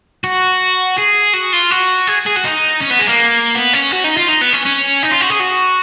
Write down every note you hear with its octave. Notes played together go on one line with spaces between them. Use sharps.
F#4
G#4
F#4
F4
F#4
G#4
G#4
F#4
D#4
C#4
B3
G#3
A#3
B3
C#4
F#4
D#4
F4
D#4
B3
C#4
C#4
D#4
F4
F#4
G#4
F#4